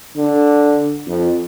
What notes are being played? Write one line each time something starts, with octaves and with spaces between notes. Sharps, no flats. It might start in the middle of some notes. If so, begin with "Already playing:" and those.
D3
F2